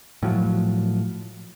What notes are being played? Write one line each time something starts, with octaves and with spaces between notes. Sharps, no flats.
A2 F3 F#3